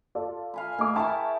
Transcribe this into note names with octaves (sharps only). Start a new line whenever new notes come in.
F4 A4 D5
F5 G#5 B5
A3 G#4 D#5 D6
E4 A#4 E5 G5 A5 C#6